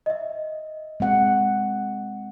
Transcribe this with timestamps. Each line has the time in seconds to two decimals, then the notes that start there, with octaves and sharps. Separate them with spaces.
0.06 D#5 E5
1.00 G#3 C4 F#5